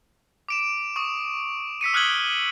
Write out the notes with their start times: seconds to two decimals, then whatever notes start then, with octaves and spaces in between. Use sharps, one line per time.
0.49 D6 D7 E7
0.96 C#6 D#6
1.81 E6 B6 C#7 D#7
1.94 D#6 F6 F#6 G#6 F#7 G7